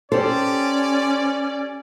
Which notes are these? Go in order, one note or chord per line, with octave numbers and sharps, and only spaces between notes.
C#4 G4 A4 C5 D5